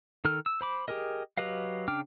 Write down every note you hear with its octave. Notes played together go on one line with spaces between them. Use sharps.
D#3 A4 F6
E6
C5 B5 D6
G4 G#4 A#4 D#5
F#3 G4 B4 D#5 F5
C#3 D4 G5 D6 F6